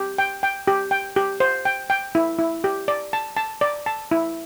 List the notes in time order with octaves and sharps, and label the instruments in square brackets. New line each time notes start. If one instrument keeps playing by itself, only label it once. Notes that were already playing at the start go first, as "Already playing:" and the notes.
Already playing: [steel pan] G4
G5
G5
G4
G5
G4
C5
G5
G5
E4
E4
G4
D5
A5
A5
D5
A5
E4